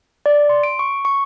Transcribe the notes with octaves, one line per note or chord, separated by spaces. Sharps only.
D5
C6
D7
C#6
C#6